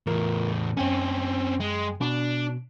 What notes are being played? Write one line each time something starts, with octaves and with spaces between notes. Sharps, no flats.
E2 A2 F4 A#4
F#2 C4 C#4 G5 G#5
G#3
B2 D4